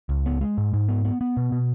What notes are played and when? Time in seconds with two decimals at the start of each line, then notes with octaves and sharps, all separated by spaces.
0.09 C#2
0.26 B3
0.41 G#3
0.58 G#2
0.74 G#2
0.88 B3
1.05 B3
1.21 B3
1.37 B2
1.52 B2